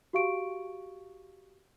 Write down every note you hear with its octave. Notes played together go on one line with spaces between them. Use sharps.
F#4 G4 F5 C#6 D7